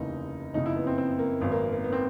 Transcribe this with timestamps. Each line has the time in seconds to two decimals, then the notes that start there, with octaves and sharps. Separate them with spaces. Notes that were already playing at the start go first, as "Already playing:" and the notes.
Already playing: F1 D#2 C#3 E3 D#4
0.54 F#1 F2 C#3 D#4
0.66 E4
0.76 B3
0.87 C4
0.98 C4
1.19 A#3
1.41 G#1 F#2 D#3 B3
1.52 A#3
1.72 A#3
1.84 B3
1.92 C4